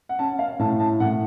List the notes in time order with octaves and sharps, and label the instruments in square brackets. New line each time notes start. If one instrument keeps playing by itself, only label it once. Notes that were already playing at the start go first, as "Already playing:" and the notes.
[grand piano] F#5
C#4 A5
F5
A2 A5
A5
A2 F#5